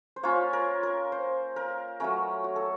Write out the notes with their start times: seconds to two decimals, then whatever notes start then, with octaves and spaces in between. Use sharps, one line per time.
0.16 C5
0.23 A#3 C#4 F4 C#5
0.53 A#4
0.83 A#4
1.12 C5
1.56 A#4
2.00 F#3 A3 C#4 A#4
2.44 F#4
2.56 A4